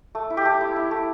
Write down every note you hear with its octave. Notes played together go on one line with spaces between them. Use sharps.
A3
E4
G4
A3
E4
E4
A3